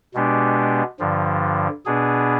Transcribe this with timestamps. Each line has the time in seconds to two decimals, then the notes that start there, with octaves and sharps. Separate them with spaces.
0.14 B2 G#3 B3 D4 G4
1.00 G2 D3 F3
1.86 B2 B3 D4 G#4